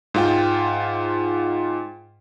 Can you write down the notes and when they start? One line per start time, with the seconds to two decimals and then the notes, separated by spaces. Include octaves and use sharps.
0.14 G#2 F4 G5